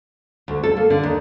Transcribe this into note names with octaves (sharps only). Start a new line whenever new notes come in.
D2
A4
A#3
D3
D#2